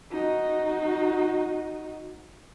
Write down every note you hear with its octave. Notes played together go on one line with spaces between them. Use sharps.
D#4 F#4